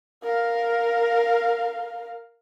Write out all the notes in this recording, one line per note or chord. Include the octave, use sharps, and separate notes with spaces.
A#4 F5